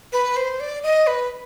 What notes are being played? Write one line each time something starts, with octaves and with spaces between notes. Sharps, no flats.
B4
C5
D5
D#5
B4